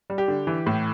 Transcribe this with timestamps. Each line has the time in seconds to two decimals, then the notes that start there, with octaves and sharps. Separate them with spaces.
0.10 G3
0.18 G4
0.28 D3
0.47 E3
0.66 A2